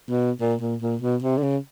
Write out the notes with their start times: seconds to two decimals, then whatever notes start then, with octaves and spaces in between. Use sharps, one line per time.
0.10 B2
0.41 A#2
0.61 A#2
0.82 A#2
1.02 B2
1.23 C3
1.38 D3
1.43 C#3